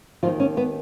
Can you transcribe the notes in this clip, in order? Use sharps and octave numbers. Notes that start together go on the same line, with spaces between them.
D#2 D#3 F3 A#3 F4
C#4
B3